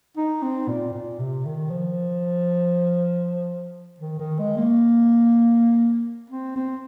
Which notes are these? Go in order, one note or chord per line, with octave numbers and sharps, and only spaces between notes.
D#4
C4
A#2
A#2
C3
D#3
F3
D#3
D#3
G#3
A#3
C4
C4